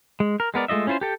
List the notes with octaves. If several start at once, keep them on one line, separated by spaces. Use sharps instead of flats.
G#3
A#4
G#3 B3 A#4 D5
G#3 A3 F4 D#5 E5
C#4 E4 F4 A4 C5
G4 A4 G5